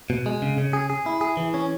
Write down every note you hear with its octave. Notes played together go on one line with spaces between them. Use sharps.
B2
G#3
C#3
C#3
G#4
G#4
E4
G#4
E3
C#4